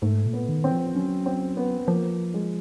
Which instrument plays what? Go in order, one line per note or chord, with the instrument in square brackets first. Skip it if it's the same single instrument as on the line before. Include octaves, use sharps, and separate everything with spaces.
[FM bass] G#2 [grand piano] A3
[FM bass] A#2
[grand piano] B3
[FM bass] D#3
[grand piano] C4
[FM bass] F3
[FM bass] F#3 [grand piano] C#4
[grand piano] C4
B3
[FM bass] F3 [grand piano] A#3
[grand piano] G#3